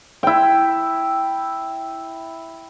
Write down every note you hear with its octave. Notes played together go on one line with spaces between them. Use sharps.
E4 G5